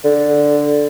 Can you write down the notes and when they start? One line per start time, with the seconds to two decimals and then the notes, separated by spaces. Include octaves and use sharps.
0.04 D3